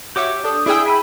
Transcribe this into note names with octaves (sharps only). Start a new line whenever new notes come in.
F#4 G4 C#5 E5 D6
D4 A4 D#6
D4 E4 G#4 G5 E6
E5 G#5 B5 E6